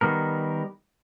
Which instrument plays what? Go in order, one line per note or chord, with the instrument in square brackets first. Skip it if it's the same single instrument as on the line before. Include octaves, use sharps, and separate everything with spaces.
[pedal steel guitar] D#3 G3 B3 A#4